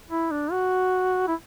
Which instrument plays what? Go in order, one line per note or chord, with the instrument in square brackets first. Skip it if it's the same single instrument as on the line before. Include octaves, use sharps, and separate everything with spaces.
[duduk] E4
D4
F#4
E4